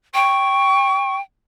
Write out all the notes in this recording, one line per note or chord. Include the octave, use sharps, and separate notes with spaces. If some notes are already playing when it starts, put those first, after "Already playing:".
G5 C#6